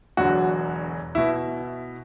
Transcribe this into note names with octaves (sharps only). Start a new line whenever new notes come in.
E1 E2 D3 F#3 F#4
B2 E4